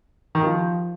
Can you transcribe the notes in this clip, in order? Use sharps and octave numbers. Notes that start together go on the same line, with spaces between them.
D#3
F3